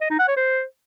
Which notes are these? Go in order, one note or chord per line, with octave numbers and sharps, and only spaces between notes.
D#5
D#4
F#5
C#5
C5